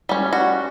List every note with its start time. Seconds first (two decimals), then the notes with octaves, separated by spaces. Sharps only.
0.09 G3 C#4
0.33 F#4